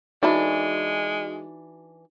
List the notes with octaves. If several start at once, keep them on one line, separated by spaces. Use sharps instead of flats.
E3 G#3 D4 D#4 F#4